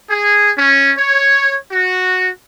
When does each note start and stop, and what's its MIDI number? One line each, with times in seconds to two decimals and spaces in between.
0.10 0.51 68
0.58 0.92 61
0.98 1.57 73
1.71 2.28 66